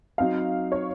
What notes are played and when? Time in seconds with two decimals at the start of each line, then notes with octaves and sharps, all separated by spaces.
0.18 F#3 C4 D#4 F5
0.72 C#5